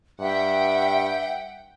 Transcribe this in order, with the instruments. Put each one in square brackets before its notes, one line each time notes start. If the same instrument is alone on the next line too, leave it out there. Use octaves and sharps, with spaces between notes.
[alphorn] G2 [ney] E5 [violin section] F#5 G5